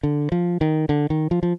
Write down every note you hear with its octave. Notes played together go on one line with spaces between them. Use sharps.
D3
F3
D#3
D3
D#3
F3
F3